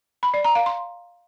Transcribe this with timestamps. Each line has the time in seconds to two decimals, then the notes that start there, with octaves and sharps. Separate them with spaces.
0.23 B5
0.34 D5
0.44 A#5
0.55 F5
0.66 C6